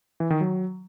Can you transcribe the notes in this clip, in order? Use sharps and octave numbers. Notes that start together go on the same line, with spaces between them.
E3
D#3
F#3